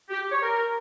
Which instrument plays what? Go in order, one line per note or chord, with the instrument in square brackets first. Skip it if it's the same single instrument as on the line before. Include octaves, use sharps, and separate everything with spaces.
[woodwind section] G4
G4
C#5
A#4